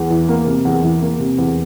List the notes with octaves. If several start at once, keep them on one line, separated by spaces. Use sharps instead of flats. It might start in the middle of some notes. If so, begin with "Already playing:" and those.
Already playing: E2
E3
A#3
C3
E2
E3
A#3
C3
E2